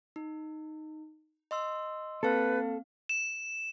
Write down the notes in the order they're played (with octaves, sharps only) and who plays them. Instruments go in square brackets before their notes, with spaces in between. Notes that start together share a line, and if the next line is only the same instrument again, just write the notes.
[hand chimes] D#4
D#5 C6 E6
[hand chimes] A#3 C4 F5 [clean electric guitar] A4 [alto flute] B4
[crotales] E7